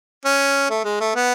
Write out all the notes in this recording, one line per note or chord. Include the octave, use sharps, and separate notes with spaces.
C#4
A3
G#3
A3
B3